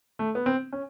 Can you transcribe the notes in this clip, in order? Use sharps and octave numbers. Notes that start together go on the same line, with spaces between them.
A3
B3
C4
C#4